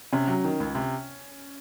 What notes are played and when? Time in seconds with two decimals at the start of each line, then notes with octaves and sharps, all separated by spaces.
0.13 C3 C#4
0.28 F#3
0.44 D#3
0.60 C#2
0.75 C3